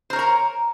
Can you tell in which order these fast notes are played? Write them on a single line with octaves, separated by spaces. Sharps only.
C5 A#4 C#5 A#5